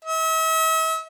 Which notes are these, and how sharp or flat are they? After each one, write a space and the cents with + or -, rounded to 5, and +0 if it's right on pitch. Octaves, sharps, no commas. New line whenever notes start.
E5 -40